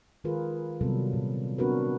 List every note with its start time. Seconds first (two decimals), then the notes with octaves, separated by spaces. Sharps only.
0.24 D#3 G#3 F4 G#4 A#4 B4
0.81 C3 D#3 F#3 G3 B3 A4
1.13 A#2
1.58 B3 C4 D4 F#4 A#4 B4